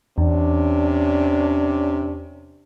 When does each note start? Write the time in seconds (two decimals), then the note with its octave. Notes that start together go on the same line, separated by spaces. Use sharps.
0.18 E2 C3 C#4 D4